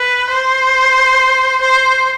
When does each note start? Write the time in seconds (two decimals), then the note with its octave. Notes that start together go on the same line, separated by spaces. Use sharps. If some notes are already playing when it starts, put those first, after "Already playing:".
Already playing: B4
0.29 C5
1.61 C5